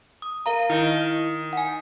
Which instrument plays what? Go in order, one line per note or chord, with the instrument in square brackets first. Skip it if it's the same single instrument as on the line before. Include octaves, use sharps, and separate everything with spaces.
[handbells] D#6
A#4 F5 A#5
[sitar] D#3 [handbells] E4
[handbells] F#5 G#5